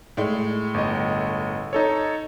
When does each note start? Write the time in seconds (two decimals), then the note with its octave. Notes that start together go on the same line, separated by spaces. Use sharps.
0.17 A2 G#3
0.74 G1 D#5
1.73 D#4 A4 C#5